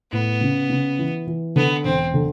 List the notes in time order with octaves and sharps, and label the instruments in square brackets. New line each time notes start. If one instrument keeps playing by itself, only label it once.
[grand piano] A2 [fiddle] B3
[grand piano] C#3
C#3
E3
E3
[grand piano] D3 [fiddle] B3
[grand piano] E1 [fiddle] C4
[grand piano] D3